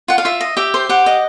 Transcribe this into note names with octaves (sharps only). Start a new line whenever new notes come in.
F4 F#5
F5
F4 E5
D#5
G4 E5
C5
G4 F#5
D#5